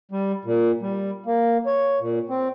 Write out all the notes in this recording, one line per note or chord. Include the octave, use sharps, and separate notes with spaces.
G3
A#2
G3
A#3
C#5
A#2
C4